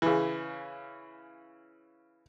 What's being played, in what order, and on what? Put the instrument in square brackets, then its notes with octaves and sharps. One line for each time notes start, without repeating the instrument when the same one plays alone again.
[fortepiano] C#3 E3